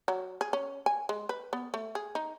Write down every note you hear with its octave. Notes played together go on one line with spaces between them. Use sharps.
F#3
G#4
C#4
G#5
G#3
B4
B3
A3
G#4
D#4